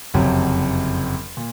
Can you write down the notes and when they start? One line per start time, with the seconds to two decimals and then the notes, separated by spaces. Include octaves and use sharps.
0.14 F#1 F2 C3 F#3
1.37 A#2